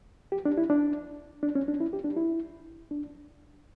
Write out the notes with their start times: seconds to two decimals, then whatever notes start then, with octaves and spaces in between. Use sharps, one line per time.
0.32 G4
0.45 D4
0.58 E4
0.70 D4
1.43 D4
1.55 C#4
1.68 D4
1.80 E4
1.93 G4
2.04 D4
2.16 E4
2.91 D4